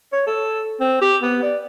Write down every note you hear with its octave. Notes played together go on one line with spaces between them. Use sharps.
C#5
A4
C4
G4
B3
D5